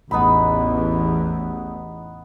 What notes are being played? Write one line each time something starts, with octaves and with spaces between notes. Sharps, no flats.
A1 E2 B3 D#4 B5